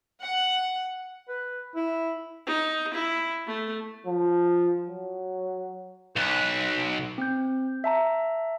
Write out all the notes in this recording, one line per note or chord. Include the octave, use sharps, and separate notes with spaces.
F#5
B4
E4
D#4
E4
A3
F3
F#3
B1 B4
C4 G6
E5 A5 A#5